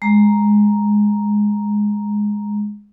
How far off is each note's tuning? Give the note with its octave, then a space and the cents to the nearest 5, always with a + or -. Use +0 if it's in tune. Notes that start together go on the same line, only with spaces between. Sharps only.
G#3 +0 A#5 +0